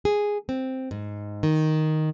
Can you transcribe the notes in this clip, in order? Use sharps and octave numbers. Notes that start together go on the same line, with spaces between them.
G#4
C4
G#2
D#3